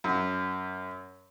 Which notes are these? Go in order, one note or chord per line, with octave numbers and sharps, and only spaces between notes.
F#2